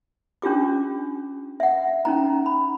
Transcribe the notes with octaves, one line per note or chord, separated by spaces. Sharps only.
C#4 D4 F4 G4 D6
E5 F#5
C#4 D#4 A#5
B5